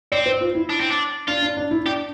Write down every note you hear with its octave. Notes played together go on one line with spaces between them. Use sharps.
C4 D5
C5
F4
E4
D4
C4
D4
D4 F4
D4
D4
E4
D4 G4